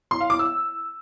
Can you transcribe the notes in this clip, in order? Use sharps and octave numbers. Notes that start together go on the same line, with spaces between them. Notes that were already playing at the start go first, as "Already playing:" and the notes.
C6
F5
D6
E6